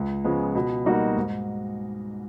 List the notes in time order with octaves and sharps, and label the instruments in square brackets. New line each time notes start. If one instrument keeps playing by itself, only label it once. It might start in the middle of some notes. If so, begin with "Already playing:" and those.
Already playing: [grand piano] C#2
C#3 F3 G#3 B3
B2
G3 A#3 D#4 F#4
G#2